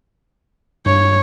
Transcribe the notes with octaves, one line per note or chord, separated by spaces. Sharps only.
G2 C#5